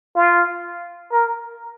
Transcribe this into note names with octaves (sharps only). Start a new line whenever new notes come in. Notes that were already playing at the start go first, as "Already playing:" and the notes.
F4
A#4